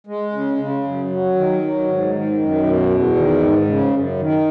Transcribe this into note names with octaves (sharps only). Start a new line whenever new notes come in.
G#3
C#3
C#3
F#2
F#3
D#3
F#3
G#2
D#3
F#2
B2
E2
D#3
G#2
C#3
F#2
D#3